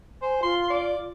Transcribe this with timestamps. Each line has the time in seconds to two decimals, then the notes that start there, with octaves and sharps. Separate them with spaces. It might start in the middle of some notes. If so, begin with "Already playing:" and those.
0.22 C5 G#5
0.43 F4 C6
0.70 D5